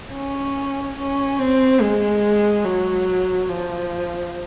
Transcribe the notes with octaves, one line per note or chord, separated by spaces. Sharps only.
C#4
C#4
C4
G#3
F#3
F3